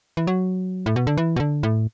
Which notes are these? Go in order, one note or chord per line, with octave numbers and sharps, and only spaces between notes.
E3
F#3
A2
B2
D3
E3
B2
D3
A2